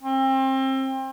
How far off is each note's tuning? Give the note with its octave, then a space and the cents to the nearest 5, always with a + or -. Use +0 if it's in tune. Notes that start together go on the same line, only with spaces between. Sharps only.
C4 +30